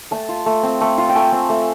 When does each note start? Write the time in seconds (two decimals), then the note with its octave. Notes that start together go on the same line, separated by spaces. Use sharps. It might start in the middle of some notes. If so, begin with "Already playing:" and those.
0.11 A3 A5
0.29 F4
0.46 A3
0.63 C4
0.81 A3
0.98 F4
1.09 G5
1.16 A3 G#5
1.32 C4
1.49 A3